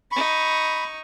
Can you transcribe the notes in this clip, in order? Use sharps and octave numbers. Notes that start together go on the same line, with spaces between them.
D#4 B5 C#6